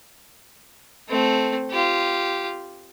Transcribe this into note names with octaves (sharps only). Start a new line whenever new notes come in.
A3 C4
F4 G4